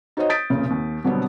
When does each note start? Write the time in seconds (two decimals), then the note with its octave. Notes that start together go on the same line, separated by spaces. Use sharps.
0.17 D#4 F#4 C5 C#5 D#5
0.29 D#6 G6 A6 B6 D7
0.50 F1 A#2 C#3
0.70 D#2
1.04 B2 D3 F#3 G3 B3 C4